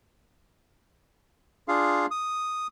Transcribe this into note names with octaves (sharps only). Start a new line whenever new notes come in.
D4 F4 G#4 F5
D#6